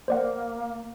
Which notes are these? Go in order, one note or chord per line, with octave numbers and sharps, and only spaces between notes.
A#3 C5 D5 F#5